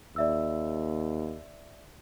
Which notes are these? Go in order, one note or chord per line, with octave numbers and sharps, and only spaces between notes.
D#2 D5 E5 E6